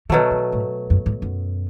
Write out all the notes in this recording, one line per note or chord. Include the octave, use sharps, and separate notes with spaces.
B2 D#3 F#3 A3
D#3
A2
F#2
G#2
F#2